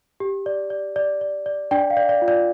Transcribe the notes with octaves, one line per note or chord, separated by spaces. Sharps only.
G4
D5
D5
D5
D5
D5
D4 D5 G5
F5
D5
D5
F4
D5